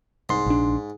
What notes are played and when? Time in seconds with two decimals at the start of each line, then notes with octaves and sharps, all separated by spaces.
0.29 C2 G#2 C6
0.46 A#1 D4